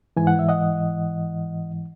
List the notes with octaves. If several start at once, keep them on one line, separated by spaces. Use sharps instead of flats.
G#2 E3 G#5
F#5
E5
D#5 F#5